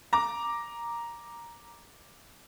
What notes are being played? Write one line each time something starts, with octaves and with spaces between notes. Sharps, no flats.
A#5 D6